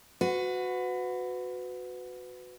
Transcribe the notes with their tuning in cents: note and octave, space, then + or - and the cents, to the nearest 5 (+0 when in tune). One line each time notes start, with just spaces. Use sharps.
F#4 -15 B4 +25